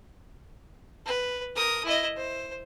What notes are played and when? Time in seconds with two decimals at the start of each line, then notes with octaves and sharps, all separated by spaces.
1.06 B4
1.56 A#4 D#6
1.85 E4 D#5
2.16 C5